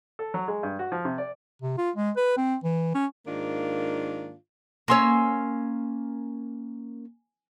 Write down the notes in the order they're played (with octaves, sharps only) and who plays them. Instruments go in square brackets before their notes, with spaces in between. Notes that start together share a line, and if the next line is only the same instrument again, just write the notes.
[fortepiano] A4
F#3
G#3
G2
F#4
F3
C3
D5
[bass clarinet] C3
F4
G#3
B4
C4
E3
C#4
[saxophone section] G#2 D#3 A#3 D4 F4
[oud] A#3 C#4 C#5 [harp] G#5 C6 E6